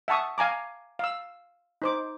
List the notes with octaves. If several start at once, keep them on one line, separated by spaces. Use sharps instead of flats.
E5 F#5 A5 C#6 D#6
F5 G#5 A#5 D6
F5 E6
D#4 C5 D6